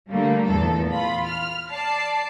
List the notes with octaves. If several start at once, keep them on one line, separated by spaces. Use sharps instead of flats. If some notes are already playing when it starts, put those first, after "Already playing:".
D3 G3 A3 A#3
E2 A#2 A4
F4 B5
F6
D5 A5 C7